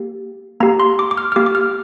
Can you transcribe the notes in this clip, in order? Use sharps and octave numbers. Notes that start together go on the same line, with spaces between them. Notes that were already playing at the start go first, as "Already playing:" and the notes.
Already playing: A#3 G4
A#3 G4 A#5
C6
D6
D6
F6
F6
A#3 G4 D6
D6
F6